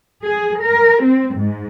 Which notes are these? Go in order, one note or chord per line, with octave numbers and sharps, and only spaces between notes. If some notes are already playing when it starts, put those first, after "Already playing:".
G#4
A#4
C4
G#2